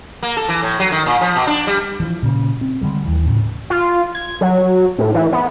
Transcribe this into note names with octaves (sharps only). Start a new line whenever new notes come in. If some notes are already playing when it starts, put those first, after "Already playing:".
A#3
A4
E3
A2
F#3
D#3
A#2
F3
B2
D4
G3
E3 F3
A#2 C#3
C4
D3 G3 G#3
D#2 E3
A2 C#3
F4
G#6
F#3
A2
E3
B3